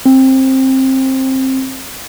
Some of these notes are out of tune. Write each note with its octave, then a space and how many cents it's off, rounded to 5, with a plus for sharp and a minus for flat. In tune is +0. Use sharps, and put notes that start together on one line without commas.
C4 +15